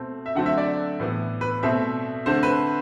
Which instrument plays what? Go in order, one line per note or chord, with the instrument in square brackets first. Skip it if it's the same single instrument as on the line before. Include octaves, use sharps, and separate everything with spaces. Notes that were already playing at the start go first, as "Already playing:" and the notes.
Already playing: [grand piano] B2 A3 C4
E5
D3 F#3 A3 C4 F#5
E5
D5
A2 E3 B3
B4
B2 A3 C4 E5
D3 A3 C4 C5
B4